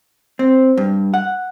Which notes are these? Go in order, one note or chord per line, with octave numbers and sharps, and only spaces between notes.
C4
G2
F#5